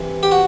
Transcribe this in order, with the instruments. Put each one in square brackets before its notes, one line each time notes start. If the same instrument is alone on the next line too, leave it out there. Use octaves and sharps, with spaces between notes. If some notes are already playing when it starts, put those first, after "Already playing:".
Already playing: [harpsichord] C3 E3
G4
F#4